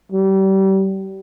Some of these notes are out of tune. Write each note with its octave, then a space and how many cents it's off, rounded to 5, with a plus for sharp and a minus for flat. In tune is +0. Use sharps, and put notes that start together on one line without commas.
G3 -30